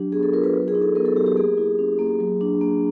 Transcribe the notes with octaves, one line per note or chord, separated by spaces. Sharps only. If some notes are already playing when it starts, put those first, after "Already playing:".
Already playing: F#3 D4 G4
B3 G#4
A4
F4 A#4
B4
F#3
G#4
D#4
A4
B3 A#4
A4
F#3 G4
G4
A#3 G#4
E4
C#4
A#3
F#3
D4
A#3